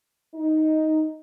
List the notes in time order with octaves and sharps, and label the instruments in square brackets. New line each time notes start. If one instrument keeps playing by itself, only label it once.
[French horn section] D#4